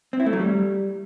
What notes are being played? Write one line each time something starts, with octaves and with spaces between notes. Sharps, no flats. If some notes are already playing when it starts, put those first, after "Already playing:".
C4
E4
A3
F#3
G3